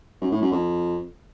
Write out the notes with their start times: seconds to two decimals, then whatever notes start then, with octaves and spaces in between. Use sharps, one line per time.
0.21 F#2
0.32 A2
0.42 F#2
0.52 F2